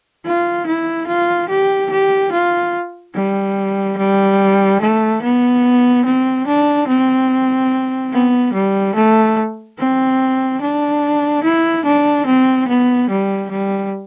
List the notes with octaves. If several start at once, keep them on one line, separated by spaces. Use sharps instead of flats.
F4
E4
F4
G4
G4
F4
G3
G3
A3
B3
C4
D4
C4
B3
G3
A3
C4
D4
E4
D4
C4
B3
G3
G3